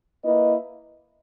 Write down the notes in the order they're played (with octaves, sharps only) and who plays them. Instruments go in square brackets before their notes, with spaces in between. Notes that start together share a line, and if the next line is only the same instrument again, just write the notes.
[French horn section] A#3 E4 B4 D#5